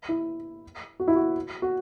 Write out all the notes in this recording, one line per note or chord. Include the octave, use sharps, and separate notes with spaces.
E4
F#4
E4
F#4
F#4